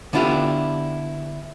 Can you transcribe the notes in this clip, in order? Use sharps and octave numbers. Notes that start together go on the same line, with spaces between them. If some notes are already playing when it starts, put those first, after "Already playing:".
D3 B3 D4 E4 F4 G4